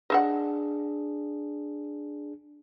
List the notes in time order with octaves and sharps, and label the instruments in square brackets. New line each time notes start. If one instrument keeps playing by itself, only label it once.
[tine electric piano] D4 G#4 [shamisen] D#5 E5 F#5